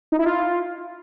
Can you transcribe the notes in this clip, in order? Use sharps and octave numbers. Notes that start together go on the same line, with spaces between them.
D#4
E4
F4